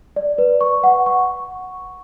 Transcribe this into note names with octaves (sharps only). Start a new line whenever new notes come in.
D5
B4
C#6
F#5
C#6